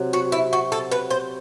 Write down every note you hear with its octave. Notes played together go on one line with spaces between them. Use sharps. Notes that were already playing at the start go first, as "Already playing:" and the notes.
Already playing: C3 F#3
F#4
E4
F#4
A4
B4
C5